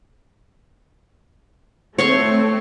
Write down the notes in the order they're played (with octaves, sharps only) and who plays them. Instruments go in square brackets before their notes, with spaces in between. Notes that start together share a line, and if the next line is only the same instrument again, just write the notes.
[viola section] A3 C4 [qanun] C#5 C6 C#6